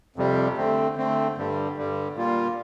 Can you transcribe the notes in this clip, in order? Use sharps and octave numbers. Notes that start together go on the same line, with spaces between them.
F2 C3 G3
D3 A3 C4
D3 A3 C4
G2 D3 G3
G2 D3 G3
A#2 G3 A#3 F4